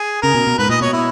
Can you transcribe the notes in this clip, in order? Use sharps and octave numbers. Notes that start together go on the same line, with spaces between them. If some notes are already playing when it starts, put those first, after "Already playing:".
Already playing: G#4
C#3 A#4
B2
B2
G#2 B4
A#2 D#5
B2 C#5
E4